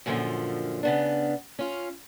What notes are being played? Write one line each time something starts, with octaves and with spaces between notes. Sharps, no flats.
F#2 A#2 D3 E3 F3
C#3 B3 D4
C#4 F4